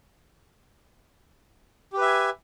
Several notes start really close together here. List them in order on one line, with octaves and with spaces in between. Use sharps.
G4 B4 E5 G#5